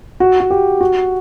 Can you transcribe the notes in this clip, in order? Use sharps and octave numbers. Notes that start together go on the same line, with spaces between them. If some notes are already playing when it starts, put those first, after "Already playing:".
F#4
F#4
G4
F#4